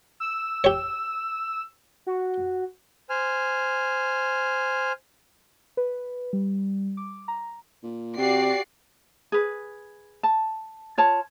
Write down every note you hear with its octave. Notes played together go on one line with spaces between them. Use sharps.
E6
G4 C#5
F#4
C5 G#5 F6
B4
G3
D6
A#5
A#2
C3 F#4 G4 D5 G5 C7
G#4 B4
A5
F4 C#5 A5